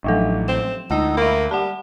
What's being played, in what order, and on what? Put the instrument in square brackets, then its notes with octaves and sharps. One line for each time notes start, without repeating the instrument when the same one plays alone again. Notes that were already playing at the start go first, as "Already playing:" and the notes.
[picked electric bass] A1 A2 [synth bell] F3 F#3 A4
[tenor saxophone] C4 [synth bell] E7
[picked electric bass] D2 [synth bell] G#3 E6 [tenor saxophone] D#4
[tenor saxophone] A#3 [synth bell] E5 B5
[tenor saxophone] G3 [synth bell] F#5 A5